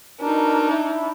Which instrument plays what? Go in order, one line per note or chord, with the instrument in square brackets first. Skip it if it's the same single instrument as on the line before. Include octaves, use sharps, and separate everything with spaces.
[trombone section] B2 A#4 [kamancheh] D4 D#4
[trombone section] E4